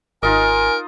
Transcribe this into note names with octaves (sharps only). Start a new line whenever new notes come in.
G#1 D#4 F4 A#4 D#5 G#5